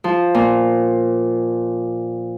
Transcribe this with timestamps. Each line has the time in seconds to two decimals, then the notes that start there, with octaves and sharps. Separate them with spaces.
0.04 F3
0.34 A#2